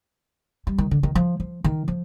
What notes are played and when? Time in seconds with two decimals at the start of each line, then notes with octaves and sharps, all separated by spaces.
0.67 G3
0.78 D#3
0.91 D3
1.03 D#3
1.15 F3
1.40 F3
1.64 D#3
1.88 F3